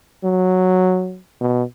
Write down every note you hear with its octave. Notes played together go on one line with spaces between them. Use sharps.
F#3
B2